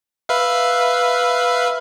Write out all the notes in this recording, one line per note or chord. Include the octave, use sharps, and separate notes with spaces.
B4 E5 F5